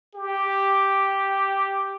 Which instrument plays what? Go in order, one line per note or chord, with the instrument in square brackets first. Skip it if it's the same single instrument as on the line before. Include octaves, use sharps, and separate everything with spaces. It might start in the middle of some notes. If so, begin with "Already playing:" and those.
[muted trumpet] G4